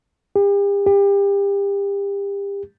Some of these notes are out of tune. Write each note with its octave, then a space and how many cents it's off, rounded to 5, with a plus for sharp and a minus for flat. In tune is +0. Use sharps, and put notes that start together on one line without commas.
G4 +40
G4 +30